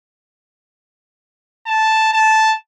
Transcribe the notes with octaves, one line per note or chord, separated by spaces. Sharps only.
A5
A5